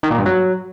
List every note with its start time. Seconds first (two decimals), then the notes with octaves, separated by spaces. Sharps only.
0.03 D#3
0.11 A#2
0.18 G2
0.26 F#3